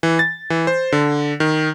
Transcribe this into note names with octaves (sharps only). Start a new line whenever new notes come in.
E3
A6
E3
C5
D3
D#3